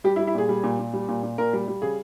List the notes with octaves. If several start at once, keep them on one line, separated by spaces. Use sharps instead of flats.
G3 G4
E4
G3
E4
A#2 G#4
G3
A#2
A#2
G3
A#2
A#2
A#2 A#4
G3
G3
C#3 G#4